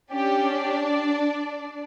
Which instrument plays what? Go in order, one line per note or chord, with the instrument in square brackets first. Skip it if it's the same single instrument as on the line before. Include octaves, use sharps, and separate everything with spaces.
[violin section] C#4 D4 G4 D5